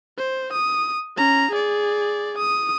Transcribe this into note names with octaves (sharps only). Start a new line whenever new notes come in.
C5
D#6
C#4 A#5
G#4 D5
D#6